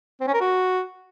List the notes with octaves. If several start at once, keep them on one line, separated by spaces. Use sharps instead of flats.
C4
C#4
A#4
F#4